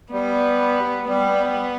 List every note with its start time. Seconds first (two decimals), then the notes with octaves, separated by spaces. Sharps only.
0.12 G3 B3
1.08 G3 B3